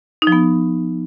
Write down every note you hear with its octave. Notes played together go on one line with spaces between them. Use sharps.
D#4
F3
B3